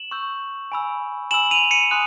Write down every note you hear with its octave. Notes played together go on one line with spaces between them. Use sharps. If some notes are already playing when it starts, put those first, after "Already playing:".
Already playing: E7 F#7
C#6 E6 G6
G#5 B5 E6
G#5 B5 E6 E7 F#7
D#7 F7
C#7 D#7
G#5 C6 D#6 F#6